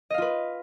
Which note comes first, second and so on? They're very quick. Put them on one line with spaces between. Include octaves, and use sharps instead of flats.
D#5 F5 F4 B4